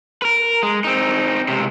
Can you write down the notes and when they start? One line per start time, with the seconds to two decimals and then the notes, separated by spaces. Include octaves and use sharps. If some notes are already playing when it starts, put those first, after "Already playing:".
0.22 A#4 B4
0.63 G#3
0.84 C4 D#4
1.48 C#2 C3